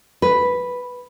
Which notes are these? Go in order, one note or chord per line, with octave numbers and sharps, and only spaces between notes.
B4